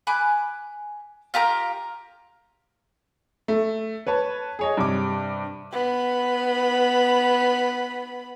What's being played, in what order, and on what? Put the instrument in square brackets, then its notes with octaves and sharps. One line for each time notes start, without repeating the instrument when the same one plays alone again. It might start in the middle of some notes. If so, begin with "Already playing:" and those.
[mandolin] G#5 B5 D6 F#6
F4 G4 A#4 A#5
[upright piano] A3
B4 C#5 A5
G#4 C#5 D#5
G2 C3 D6
[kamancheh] B3 B5